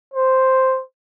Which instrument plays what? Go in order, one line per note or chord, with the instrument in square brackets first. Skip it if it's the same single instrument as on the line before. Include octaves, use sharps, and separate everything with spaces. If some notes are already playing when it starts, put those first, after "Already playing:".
[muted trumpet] C5